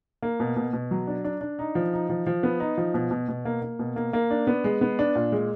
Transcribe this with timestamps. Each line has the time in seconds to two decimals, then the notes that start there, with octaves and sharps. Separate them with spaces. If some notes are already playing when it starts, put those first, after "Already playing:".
0.22 A#3
0.40 B2
0.56 B2
0.73 B2
0.91 F#3
1.07 D4
1.24 D4
1.41 D4
1.59 D#4
1.75 F3
1.93 D#4
2.10 F3
2.27 F3
2.43 B3
2.60 D#4
2.77 F3
2.94 B2
3.11 B2
3.29 B2
3.45 A#3
3.62 A#3
3.79 B2
3.96 A#3
4.13 A#3
4.30 D4
4.47 B3
4.64 G#3
4.81 B3
4.99 D4
5.15 A#2
5.32 G#3